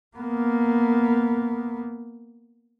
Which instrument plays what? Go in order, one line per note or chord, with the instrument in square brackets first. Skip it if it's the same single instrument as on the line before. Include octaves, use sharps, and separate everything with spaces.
[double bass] A#3 B3